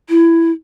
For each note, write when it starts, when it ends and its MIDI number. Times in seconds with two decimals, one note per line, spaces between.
0.09 0.51 64